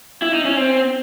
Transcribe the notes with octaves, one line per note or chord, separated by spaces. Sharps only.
E4
D#4
C#4
C4